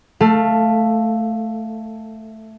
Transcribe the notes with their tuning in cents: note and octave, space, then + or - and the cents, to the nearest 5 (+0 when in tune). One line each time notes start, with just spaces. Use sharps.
A3 +0 A4 +25 F5 +0